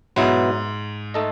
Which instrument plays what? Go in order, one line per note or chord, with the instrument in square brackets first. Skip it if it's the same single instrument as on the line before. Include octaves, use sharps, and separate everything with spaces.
[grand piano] G#2 [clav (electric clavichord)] B2 F#3 B3 E4
[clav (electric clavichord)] A3 D#4 A4 D#5